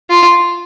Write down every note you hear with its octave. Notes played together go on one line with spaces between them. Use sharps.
F4